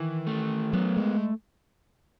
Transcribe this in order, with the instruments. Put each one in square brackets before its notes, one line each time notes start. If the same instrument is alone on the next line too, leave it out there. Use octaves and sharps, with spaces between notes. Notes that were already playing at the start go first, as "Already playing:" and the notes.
Already playing: [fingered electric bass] D#3 [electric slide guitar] E3
[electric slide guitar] A3
[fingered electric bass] F#3 [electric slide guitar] B3
[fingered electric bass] G#3